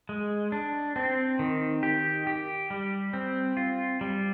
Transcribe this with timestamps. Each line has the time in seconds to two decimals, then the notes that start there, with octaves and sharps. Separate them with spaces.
0.09 G#3
0.52 D4
0.96 C4
1.39 D#3
1.83 G4
2.27 G4
2.70 G3
3.13 C4
3.57 F4
4.01 G3